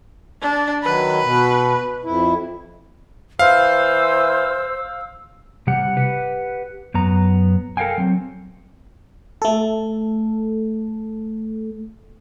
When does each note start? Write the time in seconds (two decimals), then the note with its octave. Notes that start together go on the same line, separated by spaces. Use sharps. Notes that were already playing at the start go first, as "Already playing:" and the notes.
0.42 D4
0.83 D#3 F#3 B4
1.23 B2
2.05 F2 E4
3.39 E3 C5 F5 E6
5.67 C3 G3 G4 F#5
5.97 G4 B4 F#5
6.94 F#2 B3 A#5
7.77 A4 A#4 D#5 F5 G5 G#5
7.98 F#3 C4
9.42 A3 A4